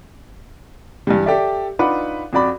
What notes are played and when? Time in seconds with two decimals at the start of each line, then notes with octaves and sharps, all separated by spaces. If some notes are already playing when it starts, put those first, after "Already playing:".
1.07 G2 E3 G3
1.26 G4 A4 D5 E5
1.79 D4 D#4 F4 B4 F#5 D6
2.33 F2 F#4 D5 B5 D6